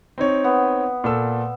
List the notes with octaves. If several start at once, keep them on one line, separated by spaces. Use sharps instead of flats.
C4 D#4 C#5
B3
A#2 A4 E6